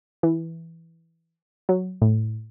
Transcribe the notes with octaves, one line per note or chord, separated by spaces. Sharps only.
E3
F#3
A2